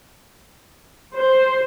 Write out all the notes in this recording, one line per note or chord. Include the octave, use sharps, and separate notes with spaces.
C5